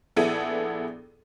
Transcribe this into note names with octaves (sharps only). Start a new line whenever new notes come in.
A#1 B3 E4 G#4 A4 D#7